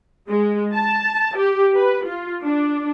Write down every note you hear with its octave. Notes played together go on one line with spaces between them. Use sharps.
G#3
A5
G4
B4
F4
D4